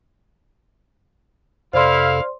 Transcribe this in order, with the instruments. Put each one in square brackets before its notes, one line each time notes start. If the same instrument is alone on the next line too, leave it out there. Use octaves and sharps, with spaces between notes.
[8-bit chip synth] F2 C3 A4 [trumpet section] E4 F5 [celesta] C5 D5 C6